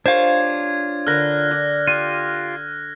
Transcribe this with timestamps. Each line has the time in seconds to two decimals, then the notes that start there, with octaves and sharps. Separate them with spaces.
0.06 D4 F4 G4 A#4 C5 C#5 F5 G#6
1.07 D3 A#4 B5 F6 F#6 A#6
1.51 D5
1.87 F4 G4 D#7